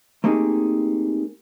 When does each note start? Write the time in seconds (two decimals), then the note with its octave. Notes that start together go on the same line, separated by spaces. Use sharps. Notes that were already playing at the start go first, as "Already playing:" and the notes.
0.24 A3 A#3 C4 D#4 G4 G#4